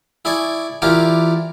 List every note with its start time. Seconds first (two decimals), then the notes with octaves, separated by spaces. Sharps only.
0.25 E4 G#4 D5 A5 C#6
0.82 E3 E4 F4 G4 A#4 D5